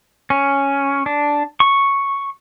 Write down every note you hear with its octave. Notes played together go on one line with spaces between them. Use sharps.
C#4
D4
C#6